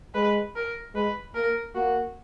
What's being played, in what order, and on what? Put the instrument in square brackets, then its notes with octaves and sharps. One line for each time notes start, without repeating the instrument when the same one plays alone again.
[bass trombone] G#3 [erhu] B4
[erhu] A#4
[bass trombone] G#3 [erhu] B4
[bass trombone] A#3 [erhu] A#4
[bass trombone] A#3 [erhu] F#4